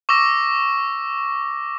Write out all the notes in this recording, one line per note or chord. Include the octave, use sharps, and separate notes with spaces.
C#6 D6 E6 A#6